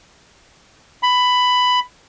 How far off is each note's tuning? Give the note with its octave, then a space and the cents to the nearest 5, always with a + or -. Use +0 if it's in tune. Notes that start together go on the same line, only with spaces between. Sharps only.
B5 +10